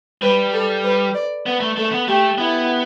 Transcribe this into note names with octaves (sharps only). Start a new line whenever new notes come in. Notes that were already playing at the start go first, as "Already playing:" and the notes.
G3 B4
A4
B4
D5
B3 B4
A3
A3 A4
B3
A3 G4
B3 E4